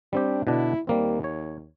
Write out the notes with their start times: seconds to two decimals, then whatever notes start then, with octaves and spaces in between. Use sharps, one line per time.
0.13 G3 C4 D4 G4
0.47 B2 D3 D4 E4
0.87 D#2 G3 A#3 C4
1.24 C#5